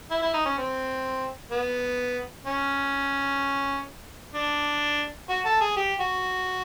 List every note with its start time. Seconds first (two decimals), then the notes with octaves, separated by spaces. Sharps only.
0.11 E4
0.22 E4
0.34 D#4
0.45 C#4
0.58 C4
1.52 B3
2.46 C#4
4.35 D4
5.30 F#4
5.45 A4
5.61 G#4
5.77 G4
6.00 F#4